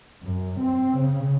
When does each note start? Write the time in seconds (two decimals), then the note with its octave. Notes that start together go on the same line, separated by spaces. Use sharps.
0.22 F#2
0.58 C4
0.97 C#3